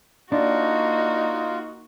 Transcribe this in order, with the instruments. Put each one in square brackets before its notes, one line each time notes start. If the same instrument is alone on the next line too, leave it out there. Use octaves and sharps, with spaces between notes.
[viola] A#3 F#4 [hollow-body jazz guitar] D4 [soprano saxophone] D#4 [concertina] F4